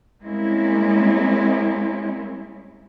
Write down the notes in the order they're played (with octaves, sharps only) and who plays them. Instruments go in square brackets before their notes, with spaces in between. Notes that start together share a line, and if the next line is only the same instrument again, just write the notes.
[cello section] G3 G#3 A#3 C4 C#4 E4